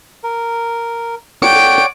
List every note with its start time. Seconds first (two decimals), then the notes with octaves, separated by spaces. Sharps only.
0.23 A#4
1.43 C#5 D5 F#5 G5 D7